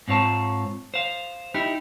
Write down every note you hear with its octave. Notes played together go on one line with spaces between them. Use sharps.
G#2 C4 F4 C#5 A5
C5 F5
D#4 E4 G4